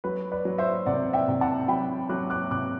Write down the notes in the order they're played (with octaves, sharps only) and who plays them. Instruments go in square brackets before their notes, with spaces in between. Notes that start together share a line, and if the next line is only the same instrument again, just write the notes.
[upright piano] F#3 B4
B4 D5
F#3
C5 E5
C3 D5 F#5
E5 G5
C3
F#5 A5
F#3 G5 B5
F#3 D6 F#6
D6 F#6
C3 D6 F#6